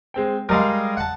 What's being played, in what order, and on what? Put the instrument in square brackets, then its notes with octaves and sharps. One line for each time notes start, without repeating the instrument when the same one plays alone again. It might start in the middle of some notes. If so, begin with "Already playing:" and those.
[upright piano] G#3 C4 G5
[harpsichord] G3 G#3 [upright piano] A#4 D#5 F5
[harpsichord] F#5 A5